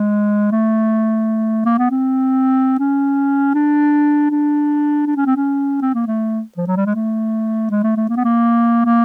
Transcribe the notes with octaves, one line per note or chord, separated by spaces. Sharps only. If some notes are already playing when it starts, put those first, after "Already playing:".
Already playing: G#3
A3
A#3
B3
C4
C#4
D4
D4
D4
C#4
C4
C#4
C4
A#3
A3
F3
F#3
G3
G#3
A3
G#3
A3
A3
A#3
B3
A#3
A#3